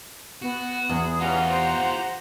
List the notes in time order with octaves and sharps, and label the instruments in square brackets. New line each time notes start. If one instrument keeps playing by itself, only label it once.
[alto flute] B3 [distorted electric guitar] F#4
[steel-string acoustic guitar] E2 [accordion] G#4
[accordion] E3 C#4 A#5 [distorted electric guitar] F4 G4 [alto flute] F#5
[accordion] C5 A#5